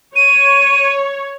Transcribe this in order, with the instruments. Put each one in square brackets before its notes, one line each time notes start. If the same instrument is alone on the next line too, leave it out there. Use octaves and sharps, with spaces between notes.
[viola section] C#5 [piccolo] D#7